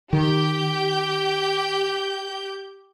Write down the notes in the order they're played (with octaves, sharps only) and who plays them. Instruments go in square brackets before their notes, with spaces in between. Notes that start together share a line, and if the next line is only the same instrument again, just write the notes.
[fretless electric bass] D#3 [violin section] G4 G6